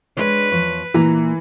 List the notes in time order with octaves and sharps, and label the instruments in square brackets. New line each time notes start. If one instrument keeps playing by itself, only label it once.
[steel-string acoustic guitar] G#3 D4 C#5 [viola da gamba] B4
[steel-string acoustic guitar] E2 F3 C#5
[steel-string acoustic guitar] A#2 A#3 A#5 [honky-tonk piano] E3